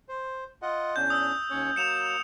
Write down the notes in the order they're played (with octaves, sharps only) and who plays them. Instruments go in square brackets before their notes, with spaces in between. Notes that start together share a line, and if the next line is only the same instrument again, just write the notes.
[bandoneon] C5
F4 D#5 F#5
[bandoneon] E2 C#4 D4 [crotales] G6
[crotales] D#6 E6
[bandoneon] D#2 C#4 C#5
[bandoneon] F#3 A#3 [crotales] C#7 E7 F7